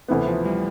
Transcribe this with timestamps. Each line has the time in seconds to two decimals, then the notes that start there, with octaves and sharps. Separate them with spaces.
0.08 D2 C3 E3 B3
0.27 F3
0.45 G3